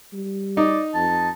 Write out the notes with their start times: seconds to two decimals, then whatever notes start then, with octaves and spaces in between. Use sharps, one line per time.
0.13 G3
0.57 D#4 D5
0.95 F2 A5